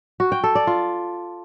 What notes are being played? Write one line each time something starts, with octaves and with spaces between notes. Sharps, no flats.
F#4
G5
A4
D5
F4